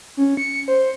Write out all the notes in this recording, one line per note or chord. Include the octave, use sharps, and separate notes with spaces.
C#4
C#7
C5